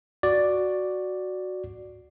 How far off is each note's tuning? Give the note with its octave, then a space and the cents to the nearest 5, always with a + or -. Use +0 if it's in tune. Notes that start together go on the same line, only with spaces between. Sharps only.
F#4 +0 D5 +0